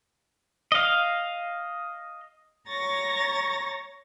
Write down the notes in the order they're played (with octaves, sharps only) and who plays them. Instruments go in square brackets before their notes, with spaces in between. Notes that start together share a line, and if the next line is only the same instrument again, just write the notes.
[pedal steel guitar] D#5 F5
[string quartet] C#5 A#5 C#6 A6 A#6